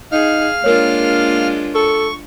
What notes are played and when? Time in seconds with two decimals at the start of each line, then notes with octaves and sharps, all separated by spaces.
0.12 D#4 G#4 F5 F6
0.64 G#3 A#3 D4 F4 A#4 C#5
1.75 A4 C#6